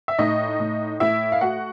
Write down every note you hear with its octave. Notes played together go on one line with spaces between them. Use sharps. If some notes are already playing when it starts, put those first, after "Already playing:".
E5
A2 D#4 D#5
A2
A2 E4 E5
F5
A3 F#4 F#5